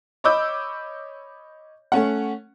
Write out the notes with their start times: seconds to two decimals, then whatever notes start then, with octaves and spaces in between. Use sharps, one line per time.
0.24 C#5 D#5 B5 D6 E6 G6
1.92 A3 C#4 F#5